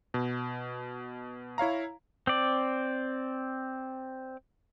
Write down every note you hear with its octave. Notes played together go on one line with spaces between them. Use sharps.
B2
E4 C#5 F5 A#5
C4 D5